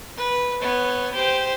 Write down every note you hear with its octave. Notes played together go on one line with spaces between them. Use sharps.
B4
B3 C#5
G4 C5